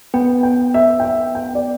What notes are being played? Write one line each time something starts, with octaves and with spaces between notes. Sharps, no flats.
B3 G5
G5
E5
G5
E5
G5
D5